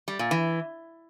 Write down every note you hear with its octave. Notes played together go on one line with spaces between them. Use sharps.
G3
A#2
E3